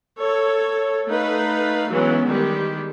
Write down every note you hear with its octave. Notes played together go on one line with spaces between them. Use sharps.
A4 C#5
A3 D#4 B4 F5
E3 F#3 G#3 B3 C#4
D#3 G3 G#3 G4